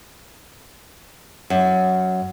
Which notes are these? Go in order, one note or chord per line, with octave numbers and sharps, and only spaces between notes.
F#2